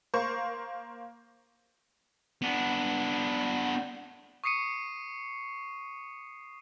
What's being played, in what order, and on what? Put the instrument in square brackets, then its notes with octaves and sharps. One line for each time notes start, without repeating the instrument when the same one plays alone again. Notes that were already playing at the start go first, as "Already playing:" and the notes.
[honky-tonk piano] A#3 C5 C#6
[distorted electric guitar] B3 D4
[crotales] C#6 D#6 C7 C#7 D#7